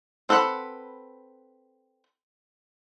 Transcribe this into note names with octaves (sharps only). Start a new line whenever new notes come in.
C4 A4 B4 F#5 B5